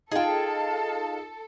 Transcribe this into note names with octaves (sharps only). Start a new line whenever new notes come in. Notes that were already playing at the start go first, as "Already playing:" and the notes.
D#4 F4 G#4 A4 F5 G5 A5